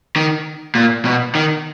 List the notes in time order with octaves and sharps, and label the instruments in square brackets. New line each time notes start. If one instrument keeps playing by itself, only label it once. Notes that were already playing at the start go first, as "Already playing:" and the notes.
[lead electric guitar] D#3
A#2
B2
D#3